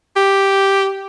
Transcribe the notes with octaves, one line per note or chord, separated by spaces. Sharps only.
G4